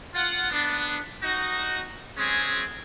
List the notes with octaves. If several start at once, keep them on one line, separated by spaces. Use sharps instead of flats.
F4 F#5
B3 D4
D#4 F#4
G#3 C4 C#4 G#4